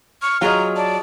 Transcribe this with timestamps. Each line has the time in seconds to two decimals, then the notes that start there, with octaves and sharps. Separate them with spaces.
0.22 C#6 F6
0.41 F#3 F4 G#4 D#5 A#5
0.76 D5 A5